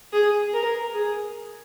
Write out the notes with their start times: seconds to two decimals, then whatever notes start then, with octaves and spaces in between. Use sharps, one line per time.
0.13 G#4
0.53 A#4
0.94 G#4